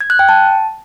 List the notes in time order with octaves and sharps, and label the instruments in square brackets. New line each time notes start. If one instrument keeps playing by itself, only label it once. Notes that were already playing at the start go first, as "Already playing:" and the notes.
[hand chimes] G#6
F#6
G5
A5